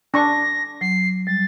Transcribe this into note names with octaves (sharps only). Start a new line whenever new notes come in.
D4 C#6 A#6
F#3 C7
G3 A6